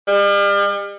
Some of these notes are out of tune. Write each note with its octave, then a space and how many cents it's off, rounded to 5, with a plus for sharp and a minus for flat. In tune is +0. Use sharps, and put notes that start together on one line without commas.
G3 +40